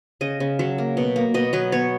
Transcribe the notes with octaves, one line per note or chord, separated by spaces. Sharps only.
C#3 D#5
C#3
F#3 E5
A#3
B2
A#3
B2 D#5
F#3 B4
B3 C#5